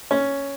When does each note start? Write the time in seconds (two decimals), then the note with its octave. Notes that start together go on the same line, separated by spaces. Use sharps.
0.11 C#4